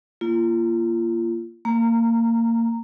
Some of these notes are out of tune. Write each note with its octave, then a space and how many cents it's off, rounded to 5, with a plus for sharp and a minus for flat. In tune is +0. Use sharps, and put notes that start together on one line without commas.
A#3 +0 F4 -35
A#3 -25 A#5 -5